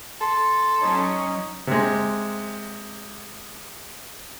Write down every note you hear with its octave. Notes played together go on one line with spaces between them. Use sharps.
A4 C6
F#3 C#4 D#4 C#5
C3 G#3